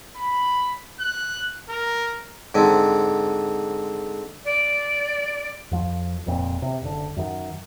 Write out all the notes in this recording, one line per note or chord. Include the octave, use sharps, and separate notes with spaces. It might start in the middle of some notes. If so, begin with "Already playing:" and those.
B5
F#6
A#4
G#2 D3 C4
D5
F2 F3
F1 F2 A#2 C4
C3
F#1 D3
F#2 D#3